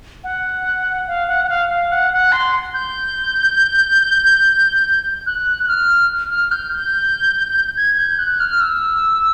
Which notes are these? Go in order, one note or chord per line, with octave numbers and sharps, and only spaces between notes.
F#5
F5
F#5
F#5
F5
F5
F#5
F#5
C6
G6
F#6
F#6
F6
F6
G6
G6
G#6
G6
F#6
F6
E6